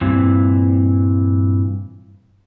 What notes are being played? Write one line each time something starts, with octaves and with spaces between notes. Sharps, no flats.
G2 A#2 E3 C4